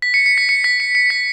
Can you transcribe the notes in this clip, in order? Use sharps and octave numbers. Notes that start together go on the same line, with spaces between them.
B6
C#7
C#7
B6
C#7
B6
C#7
C#7
B6